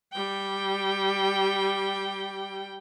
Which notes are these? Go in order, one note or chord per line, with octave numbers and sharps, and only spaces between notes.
G3 G5